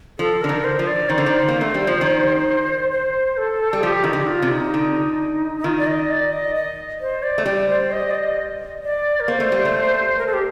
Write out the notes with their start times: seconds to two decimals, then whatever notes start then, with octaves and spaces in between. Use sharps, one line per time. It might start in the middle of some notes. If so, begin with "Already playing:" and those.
0.19 F3 A4
0.42 D3 A#4
0.49 D#3
0.64 C5
0.79 F3
0.87 D5
1.09 D#3 C5
1.18 D3
1.26 D#3
1.48 A#3
1.61 A3
1.74 G3
1.87 F3
2.01 D#3
2.91 C5
3.37 A4
3.73 G3
3.83 F3 G4
4.04 D#3 D#4
4.13 D3
4.21 G4
4.27 F4
4.42 C3
4.51 D#4
4.74 D3
5.58 D#4
5.64 D#3 F4
5.78 D5
5.87 D#5
6.10 D5
6.33 D#5
6.55 D#5
7.01 C5
7.23 D5
7.38 A3
7.46 G3 D5
7.69 C5
7.92 D#5
8.10 D5
8.15 D#5
8.83 D5
9.20 A#4
9.28 A#3 C5
9.40 A3
9.52 G3
9.65 A3
10.19 A#4
10.27 A4
10.33 G4